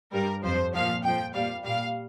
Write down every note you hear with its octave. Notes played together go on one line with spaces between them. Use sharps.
G2 G3 A#4
F2 F3 C5
A#2 F3 F5
F2 F3 G5
A#2 G3 F5
A#2 G3 F5